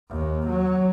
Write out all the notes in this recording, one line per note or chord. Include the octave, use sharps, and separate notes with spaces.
D#2
F#3